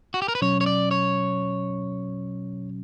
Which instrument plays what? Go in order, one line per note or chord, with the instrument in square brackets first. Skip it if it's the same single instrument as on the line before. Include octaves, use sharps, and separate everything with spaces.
[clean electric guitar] F#4
G4
A#4
B4
[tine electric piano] B2 F#3 C#4 [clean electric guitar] C#5
[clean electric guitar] C#5
D5
C#5